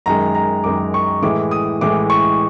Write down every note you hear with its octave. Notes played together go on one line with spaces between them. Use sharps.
F#2 D#3 G#3 A#5
A#5
F#2 D#3 G#3 D6
C#6
A2 E3 G#3 D6
D#6
A2 E3 G#3 D6
C#6